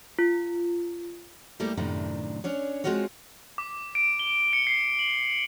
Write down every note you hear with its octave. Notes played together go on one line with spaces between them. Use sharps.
F4
G3 A3 A#3 E4 G4
F#2 A2 C3 D#3 D4
C#4 D4 C#5
G#3 A3 C4 F4 F#4 C#5
D6
D7
G7
C#7
C7
F#7